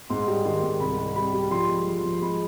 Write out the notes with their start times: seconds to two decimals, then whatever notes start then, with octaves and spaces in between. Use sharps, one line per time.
0.10 G#2 C6
0.27 G3
0.45 D#3 C6
0.63 G#2
0.80 C2 B5
0.98 C2
1.16 G3 B5
1.33 G3
1.51 F3 C6
1.69 G#3
1.86 F3
2.04 F3
2.22 G#3 B5